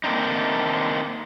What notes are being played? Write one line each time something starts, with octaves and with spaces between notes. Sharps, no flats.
A3 A#3 C4 D4 D#4